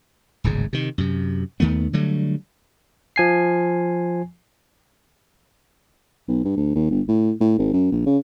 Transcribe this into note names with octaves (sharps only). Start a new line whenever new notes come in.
D1 G#1 G#2 C#3
C3 D#3
F#2 C3
D#2 D#3 A3 B3
D3 F#3 G3 A3
F3 G#5 C7
B1
G2
D2
D#2
G1
A2
A2
G#1
F#2
A#1
C#3